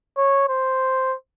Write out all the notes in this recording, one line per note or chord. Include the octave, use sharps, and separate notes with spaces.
C#5
C5